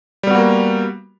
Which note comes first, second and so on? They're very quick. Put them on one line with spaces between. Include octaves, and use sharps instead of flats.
G3 B3 F#4 A#3